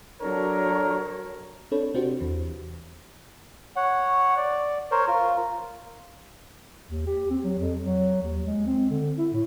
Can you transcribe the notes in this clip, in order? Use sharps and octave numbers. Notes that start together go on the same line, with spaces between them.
F#3 D4 A4 A#4 C#5
C4 D4 A4 C#5 B5
C3 C4 D4 F#4 G4 C5
E2 E3
C#5 F#5
D5
A#4 C5 C#5
F4 A#4
D#2
G4
C4
F#3
F2
F#3
D#2
G#3
C4
D3
E4
A2